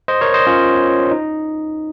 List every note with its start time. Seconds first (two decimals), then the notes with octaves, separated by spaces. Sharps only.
0.08 C5 D#5
0.21 A#4 C#5
0.34 C5 D#5
0.47 C#4 F4
1.11 D#4